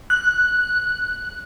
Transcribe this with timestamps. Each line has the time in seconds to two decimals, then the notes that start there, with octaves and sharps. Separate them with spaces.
0.10 F#6